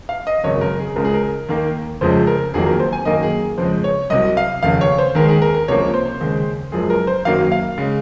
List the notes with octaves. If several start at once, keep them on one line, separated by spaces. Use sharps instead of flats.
F5
D#5
G#1 F#2 C#3 C#5
A#4
G#4
C#2 C#3 G#3 A#4
G#4
A#4
D#2 D#3 A#3
F1 F2 C#3 F3 G#3 C5
A#4
F1 F2 D#3 F#3 A#3 G#4
A#4
C5
G#5
F#2 D#3 A#3 D#5
G#4
F2 C#3 G#3 C5
C#5
C2 C3 F#3 D#5
F5
F1 D#2 C#3 F5
C#5
C5
D#2 D#3 G#3 A#4
G#4
A#4
A#4
C#2 C3 F3 A#3 C#5
C5
D#2 C#3 G#3
F#1 F#2 F3 G#3 G#4
A#4
C5
F#2 D#3 F#3 A#3 F5
F5
C#3 G#3